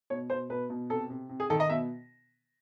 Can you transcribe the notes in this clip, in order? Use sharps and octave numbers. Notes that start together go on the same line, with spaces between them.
B2 C#5
B2 C5
B2 B4
B2
C3 A4
C3
C3
G#4
D#3 A4
D#5
B2 E5